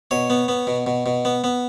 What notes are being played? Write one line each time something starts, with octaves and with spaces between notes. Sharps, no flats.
B2 C#5
B3
B3
B2
B2
B2
B3
B3